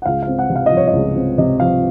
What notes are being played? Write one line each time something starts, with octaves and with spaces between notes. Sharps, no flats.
F#5
C#2 F5
C4 F5
F#5
C3
F5
D#5
F3
C#5
D#5
C#2
C4
C3 D#5
F3 F5